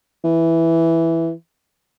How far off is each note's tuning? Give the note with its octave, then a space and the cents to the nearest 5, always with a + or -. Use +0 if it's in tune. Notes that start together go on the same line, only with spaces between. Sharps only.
E3 +0